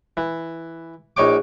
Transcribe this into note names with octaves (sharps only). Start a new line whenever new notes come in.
E3
A#1 D#4 C#5 G5 D6